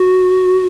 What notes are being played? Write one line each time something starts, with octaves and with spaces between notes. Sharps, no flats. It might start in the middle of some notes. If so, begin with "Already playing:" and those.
Already playing: F#4